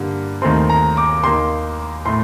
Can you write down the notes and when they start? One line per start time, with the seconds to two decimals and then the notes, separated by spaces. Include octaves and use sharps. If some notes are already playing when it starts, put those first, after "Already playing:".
Already playing: G2 D3 G3 A#3
0.42 D#2 D#3 A3 C4 C6
0.70 A#5
0.97 D6
1.24 D#2 D#3 A#3 C6
2.05 A2 A3 C6